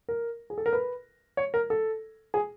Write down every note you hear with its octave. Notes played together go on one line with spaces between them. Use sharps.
A#4
G#4
A4
A#4
B4
C#5
A#4
A4
G#4